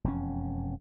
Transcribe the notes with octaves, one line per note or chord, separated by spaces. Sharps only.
E1 F2 C#4